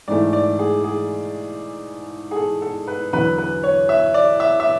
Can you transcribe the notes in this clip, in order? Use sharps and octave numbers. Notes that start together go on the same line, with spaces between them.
G#2 E3 A3 D5
D5
G#4
G#4
G#4
A4
A4
B4
E2 D3 F#3 B4
B4
C#5
E5
D5
E5
E5